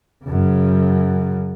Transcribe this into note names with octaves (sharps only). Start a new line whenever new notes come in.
F#2 C#3